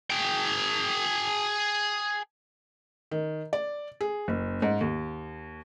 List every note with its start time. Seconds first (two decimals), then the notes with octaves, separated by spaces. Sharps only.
0.10 G#4 G5
3.11 D#3
3.53 D5
4.01 G#4
4.28 F#1
4.62 G#2
4.81 D#2